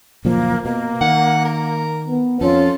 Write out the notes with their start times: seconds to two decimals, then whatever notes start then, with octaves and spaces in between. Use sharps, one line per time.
0.25 F#1 A#2 F3 A#3
0.65 B2 A#3
1.01 D#3 F#5
1.45 A#4
2.08 B3
2.41 F2 C#4 F4 A4